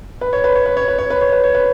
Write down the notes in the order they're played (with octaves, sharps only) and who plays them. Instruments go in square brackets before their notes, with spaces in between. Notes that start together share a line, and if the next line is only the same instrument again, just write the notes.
[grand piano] B4
C#5
B4
C#5
B4
C#5
B4
C#5
B4
C#5
B4
C#5
B4